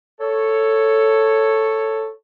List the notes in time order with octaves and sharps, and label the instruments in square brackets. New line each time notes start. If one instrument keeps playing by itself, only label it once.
[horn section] A4 C#5